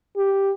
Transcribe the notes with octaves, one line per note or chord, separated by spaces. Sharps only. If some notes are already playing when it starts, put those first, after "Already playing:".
G4